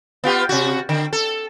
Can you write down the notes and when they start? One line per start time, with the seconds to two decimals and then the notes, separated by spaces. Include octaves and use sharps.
0.24 B3 F4 G4
0.49 C3 F#4
0.89 D3
1.13 A4